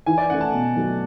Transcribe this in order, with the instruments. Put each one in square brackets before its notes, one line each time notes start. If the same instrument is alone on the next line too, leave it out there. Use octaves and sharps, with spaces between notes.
[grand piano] E3 [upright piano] G#5
[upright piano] D5
[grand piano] A3 C#4 [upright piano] F#5
[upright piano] A5
[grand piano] B2
F#3 A3